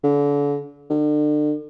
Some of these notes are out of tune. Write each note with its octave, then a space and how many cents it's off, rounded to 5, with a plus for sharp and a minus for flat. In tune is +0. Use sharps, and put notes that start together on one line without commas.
D3 -35
D3 +35